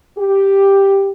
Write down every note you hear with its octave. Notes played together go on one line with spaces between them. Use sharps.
G4